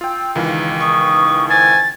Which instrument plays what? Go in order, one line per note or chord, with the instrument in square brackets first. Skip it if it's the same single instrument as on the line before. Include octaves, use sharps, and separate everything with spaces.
[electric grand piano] F4 G5 [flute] E6
[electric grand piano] C#2 D#3 E3 [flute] F4
[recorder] C#6 [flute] D#6
[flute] C5 [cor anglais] G#5 [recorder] A6